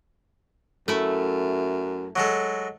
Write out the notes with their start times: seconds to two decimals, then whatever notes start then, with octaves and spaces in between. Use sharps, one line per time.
0.88 F#2 A3 E4
2.16 F#3 G#3 A4